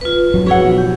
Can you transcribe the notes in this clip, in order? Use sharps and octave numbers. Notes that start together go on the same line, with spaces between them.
F4 B4
G#1 F2 F#3
E4 F#4 G#4 B4 C#5 F#5
B2 F3
G4